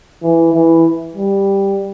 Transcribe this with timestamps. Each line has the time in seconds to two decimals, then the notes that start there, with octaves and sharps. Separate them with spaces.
0.23 E3
0.54 E3
1.15 G3